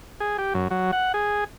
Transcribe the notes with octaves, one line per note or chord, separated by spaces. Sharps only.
G#4
G4
F#2
F#3
F#5
G#4